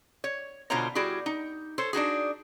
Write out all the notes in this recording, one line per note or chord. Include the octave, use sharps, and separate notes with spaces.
C#5
B2 D3 F4 C5 C#5 A#5
G3 E4 F#4 G#4
D#4
A4 C5 C#5
D4 D#4 F#4 G#4